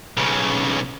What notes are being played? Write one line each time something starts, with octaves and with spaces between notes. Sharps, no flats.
B1 C#3